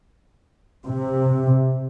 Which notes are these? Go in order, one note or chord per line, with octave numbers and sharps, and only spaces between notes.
C3